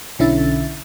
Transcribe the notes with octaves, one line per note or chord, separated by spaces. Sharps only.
B1 D3 C#4 E4 E5 A6